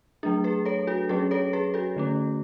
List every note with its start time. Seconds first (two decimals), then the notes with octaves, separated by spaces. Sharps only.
0.23 F#3 A3 D4 G#4
0.44 G#4 B4
0.65 A4 C#5
0.87 F#4 A4
1.09 F#3 C#4 G#4 B4
1.31 A4 C#5
1.53 G#4 B4
1.74 F#4 A4
1.96 D3 A3 C#4